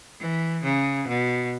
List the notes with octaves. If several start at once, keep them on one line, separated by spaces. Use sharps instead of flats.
E3
C#3
B2